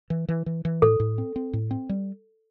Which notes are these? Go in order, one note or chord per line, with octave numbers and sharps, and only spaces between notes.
E3
E3
E3
E3
A2 A4
A2
C4
C4
A2
C4
G3